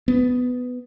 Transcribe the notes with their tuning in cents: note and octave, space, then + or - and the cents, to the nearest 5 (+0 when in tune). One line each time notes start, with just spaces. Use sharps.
B3 +10